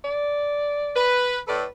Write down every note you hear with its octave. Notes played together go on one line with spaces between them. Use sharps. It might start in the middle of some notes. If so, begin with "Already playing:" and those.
D5
B4
A2 A4 B4 D5